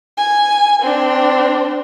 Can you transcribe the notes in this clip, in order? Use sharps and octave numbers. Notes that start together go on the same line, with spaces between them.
G#5
C4 D4